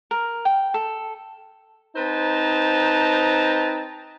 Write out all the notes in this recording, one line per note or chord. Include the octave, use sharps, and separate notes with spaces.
A#4
G5
A4
C4 D#4 B4 C5 A5 A#5